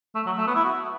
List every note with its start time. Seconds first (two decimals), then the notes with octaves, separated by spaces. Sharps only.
0.15 A3
0.26 F#3
0.38 A3
0.47 B3
0.55 E4
0.65 F#4